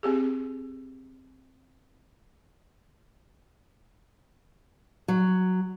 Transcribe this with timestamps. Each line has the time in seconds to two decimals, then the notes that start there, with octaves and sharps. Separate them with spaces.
0.03 C4 G4 G#4
5.08 F#3